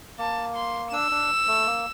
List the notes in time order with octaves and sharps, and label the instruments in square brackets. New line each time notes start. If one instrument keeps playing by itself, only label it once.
[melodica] A#3 [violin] A5
[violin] C6
[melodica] D4 [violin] E6
[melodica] D4
A3
A#3